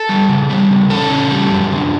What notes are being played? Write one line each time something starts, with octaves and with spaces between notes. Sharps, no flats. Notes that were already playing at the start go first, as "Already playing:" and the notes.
Already playing: A4
G3
C#3
G3
C#3
C#4 A4
C#3
G3
F#2
D3